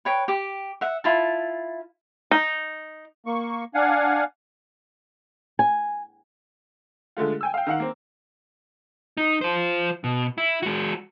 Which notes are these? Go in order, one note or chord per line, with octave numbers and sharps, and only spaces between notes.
B4 C#5 G5
G4 D6
E5 F#5
E4 F4 A5
D#4
A#3 C#6
D4 F5 F#5 G#5
G#5
D3 G#3 A3 F4
G5 G#5 E6
F5 G5
D#3 F5 F#5
A#3 C4
D#4
F4 C5
B2
E4
G#3 F#4